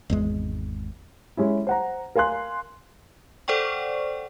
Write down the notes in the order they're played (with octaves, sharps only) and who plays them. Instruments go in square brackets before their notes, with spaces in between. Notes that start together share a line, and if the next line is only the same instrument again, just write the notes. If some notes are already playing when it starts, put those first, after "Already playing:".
[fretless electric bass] G#1 E2 G#3
[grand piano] G#3 C#4 E4
C5 F#5 A#5
A#4 F5 G#5 C6 F#6
[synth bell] A4 C5 D5 F#5 G5 C#6